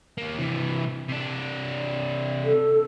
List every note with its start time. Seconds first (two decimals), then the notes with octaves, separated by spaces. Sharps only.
0.18 D#2 A#3
0.39 C3 E3
1.08 C3 D4
2.45 A4